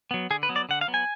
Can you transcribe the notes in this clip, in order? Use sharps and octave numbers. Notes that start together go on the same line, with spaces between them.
F#3 B3
D3 G#4
B4
F#3 B3
D5
D3 F#5
F5
F#3 B3
G#5